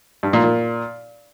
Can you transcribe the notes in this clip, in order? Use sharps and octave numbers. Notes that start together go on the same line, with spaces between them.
G2
A#2
A#2